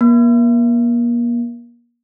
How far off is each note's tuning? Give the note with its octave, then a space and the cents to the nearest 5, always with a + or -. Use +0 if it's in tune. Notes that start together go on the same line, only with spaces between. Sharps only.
A#3 +35